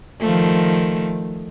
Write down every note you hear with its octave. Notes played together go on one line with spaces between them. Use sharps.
D#3 F3 A3